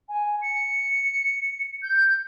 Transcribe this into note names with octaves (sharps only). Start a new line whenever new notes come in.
G#5
C#7
G6